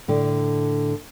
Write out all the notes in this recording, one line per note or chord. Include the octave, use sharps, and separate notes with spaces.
A2 D3